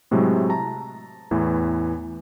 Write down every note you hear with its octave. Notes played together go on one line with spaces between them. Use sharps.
A2 C3 F#3 G#3 A3
A5 A#5
E2 A2 E3